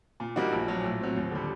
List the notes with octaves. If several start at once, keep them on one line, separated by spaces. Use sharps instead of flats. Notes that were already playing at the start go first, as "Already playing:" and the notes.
A#2
G3 A#3 D#4 F#4
A#1
A#2 F#3
A2
F#3 C4
D#2
D3 G3